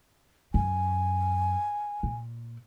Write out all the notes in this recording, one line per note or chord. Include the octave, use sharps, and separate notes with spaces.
F#2 G#5
A#2